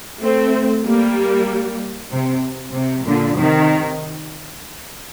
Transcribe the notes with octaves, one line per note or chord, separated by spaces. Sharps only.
A3 C4
G3 A#3
C3
C3
A#2 D3
C3 D#3